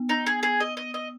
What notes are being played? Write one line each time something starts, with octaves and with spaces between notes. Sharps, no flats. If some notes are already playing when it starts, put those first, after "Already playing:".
Already playing: B3
D#4
G#4
G#4
D#5
D#5
D#5